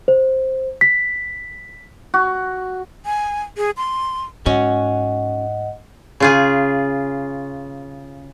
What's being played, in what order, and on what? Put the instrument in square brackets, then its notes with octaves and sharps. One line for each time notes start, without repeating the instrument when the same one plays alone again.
[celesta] C5
B6
[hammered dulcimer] F#4
[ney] G#5
G#4
C6
[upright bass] G#2 [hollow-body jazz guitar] C#4 F#4 [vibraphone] D#5 F#5
[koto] C#3 F4 G#4